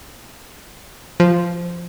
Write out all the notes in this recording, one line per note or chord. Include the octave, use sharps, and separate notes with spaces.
F3